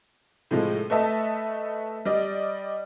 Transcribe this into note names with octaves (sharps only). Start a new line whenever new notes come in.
A2 C3 F3 G#3
A3 B4 D#5 E5 A5
G3 D5 D#5